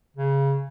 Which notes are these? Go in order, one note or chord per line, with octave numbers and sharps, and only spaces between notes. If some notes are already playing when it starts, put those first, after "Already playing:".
C#3